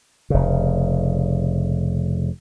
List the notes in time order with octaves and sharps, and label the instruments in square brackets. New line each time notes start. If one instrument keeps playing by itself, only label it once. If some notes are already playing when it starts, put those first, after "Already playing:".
[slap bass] F1 C#3